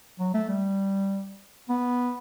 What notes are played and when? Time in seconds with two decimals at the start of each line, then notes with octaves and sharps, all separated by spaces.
0.20 F#3
0.34 A3
0.49 G3
1.69 B3